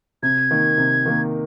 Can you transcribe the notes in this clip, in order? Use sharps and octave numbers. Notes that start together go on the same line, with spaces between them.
C3 G#6
D#3 A#3
C3
D#3 A#3